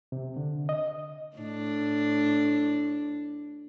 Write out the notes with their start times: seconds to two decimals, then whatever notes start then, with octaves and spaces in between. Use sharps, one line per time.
0.12 C3
0.37 D3
0.69 D#5
1.37 A2 D4